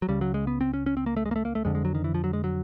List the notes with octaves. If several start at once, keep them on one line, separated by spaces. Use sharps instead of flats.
F#3
C#2 C#3 G3
F#3
G#3
B3
C4
C#4
C#4
C4
A#3
A3
G#3
A#3
A3
A#3
A3
F2 D3 G#3
G#3
F#3
D#3
E3
F3
F#3
G#3
F#3